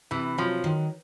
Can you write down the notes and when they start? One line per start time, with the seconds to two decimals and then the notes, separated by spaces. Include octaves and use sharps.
0.11 C3 E3
0.38 F3 F#3
0.64 D#3